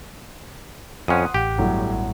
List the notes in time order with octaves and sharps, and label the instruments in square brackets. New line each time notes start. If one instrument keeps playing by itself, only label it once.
[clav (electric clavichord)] F2 C#4 [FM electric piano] F#5 C6 D#6
[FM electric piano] A1 F#5 [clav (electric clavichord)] G4
[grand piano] G1 A2 F#3